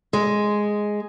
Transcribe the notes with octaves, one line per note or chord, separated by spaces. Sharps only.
G#3